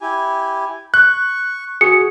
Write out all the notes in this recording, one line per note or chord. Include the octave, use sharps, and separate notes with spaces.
E4 G4 G#5
C#6 F#6
F#4 G#4 C#7